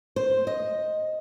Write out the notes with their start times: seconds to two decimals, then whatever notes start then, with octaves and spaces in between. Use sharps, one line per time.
0.16 C5
0.47 D#5